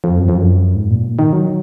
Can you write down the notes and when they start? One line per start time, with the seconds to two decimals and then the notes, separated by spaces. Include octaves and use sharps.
0.04 F2
0.19 F#2
0.29 F2
0.38 F#2
0.76 G#2
0.90 A#2
1.19 D#3
1.33 F#3